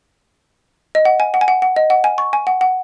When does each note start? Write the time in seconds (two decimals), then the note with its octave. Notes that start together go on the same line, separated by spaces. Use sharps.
0.95 D#5
1.05 F#5
1.20 G#5
1.34 F#5
1.41 G#5
1.48 F#5
1.62 F#5
1.76 D#5
1.90 F#5
2.04 G#5
2.18 C#6
2.33 G#5
2.47 F#5
2.61 F#5